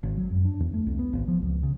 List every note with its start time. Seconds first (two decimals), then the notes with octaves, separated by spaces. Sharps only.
0.03 G#1
0.18 F#3
0.31 F#2
0.45 D4
0.60 E2
0.74 A3
0.86 C2
0.99 B3
1.13 G#1
1.28 F3
1.42 C#2
1.63 C#3